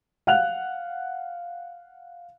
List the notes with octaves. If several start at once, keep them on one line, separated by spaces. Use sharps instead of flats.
F5 F#5 F#6 F7